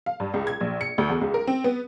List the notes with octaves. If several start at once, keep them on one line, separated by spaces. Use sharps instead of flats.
F5
G2
C#2
G#6
A#1
C#7
D2
E2
C#2
A#4
C4
B3